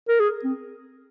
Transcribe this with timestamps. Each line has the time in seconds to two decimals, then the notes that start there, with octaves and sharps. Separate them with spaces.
0.08 A#4
0.20 G#4
0.44 C4